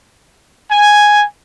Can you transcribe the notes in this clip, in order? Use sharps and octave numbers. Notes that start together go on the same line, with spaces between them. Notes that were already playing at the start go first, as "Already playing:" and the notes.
G#5